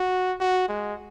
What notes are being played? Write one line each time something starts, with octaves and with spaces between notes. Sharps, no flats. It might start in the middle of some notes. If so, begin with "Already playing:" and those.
Already playing: F#4
F#4
G#3